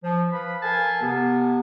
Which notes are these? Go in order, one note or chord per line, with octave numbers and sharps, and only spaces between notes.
F3
B4 F5 B5
A4 A#4 F5 G#5 A5
C3 B3